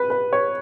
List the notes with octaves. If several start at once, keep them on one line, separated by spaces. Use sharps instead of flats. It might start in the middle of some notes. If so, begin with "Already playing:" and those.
Already playing: B4
B4
C#5